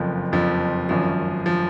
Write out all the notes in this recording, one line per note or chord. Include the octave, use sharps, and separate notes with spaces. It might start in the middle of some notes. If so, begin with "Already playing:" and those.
Already playing: F#1 F2 F3
F#1 F2 F3
G#1 F#2 F3
F3